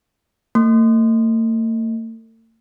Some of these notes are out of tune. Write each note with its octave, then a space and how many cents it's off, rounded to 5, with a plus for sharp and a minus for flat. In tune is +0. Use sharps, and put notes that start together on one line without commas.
A3 +45